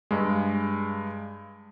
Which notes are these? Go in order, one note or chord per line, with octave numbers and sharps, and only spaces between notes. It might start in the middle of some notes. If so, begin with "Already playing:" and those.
G2 G#3